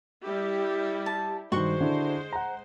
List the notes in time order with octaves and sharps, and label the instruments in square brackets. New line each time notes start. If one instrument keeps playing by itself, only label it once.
[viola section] G3 E4 G4
[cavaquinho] A5
[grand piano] G2 D#3 [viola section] G#3 C5 [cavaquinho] F#4 C6 C#6
[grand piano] D3 D4 E4
F#5 A#5